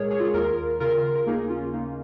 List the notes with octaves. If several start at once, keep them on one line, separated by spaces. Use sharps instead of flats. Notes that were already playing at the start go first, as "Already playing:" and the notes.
Already playing: A#2 G#3 G#4 A#4 C#5
G#4 C#5
F4
G#4
D#2 F4 A#4
C#3 F4 A#4
A#4
A#3 D#4 G#4
C#4 F4
A#3 D#4